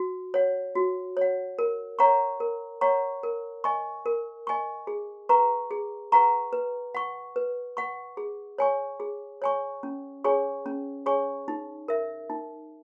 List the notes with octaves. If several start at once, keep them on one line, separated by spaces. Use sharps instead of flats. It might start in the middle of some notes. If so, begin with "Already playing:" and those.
Already playing: F#4
C#5 F#5
F#4
C#5 F#5
A#4
C#5 F#5 A#5 C#6
A#4
C#5 F#5 A#5 C#6
A#4
D#5 G#5 C#6
A#4
D#5 G#5 C#6
G#4
B4 F#5 A#5 C#6
G#4
B4 F#5 A#5 C#6
B4
F#5 C#6
B4
F#5 C#6
G#4
C#5 G#5 C#6
G#4
C#5 G#5 C#6
C#4
G#4 C#5 G#5 C#6
C#4
G#4 C#5 G#5 C#6
D#4
A#4 E5
D#4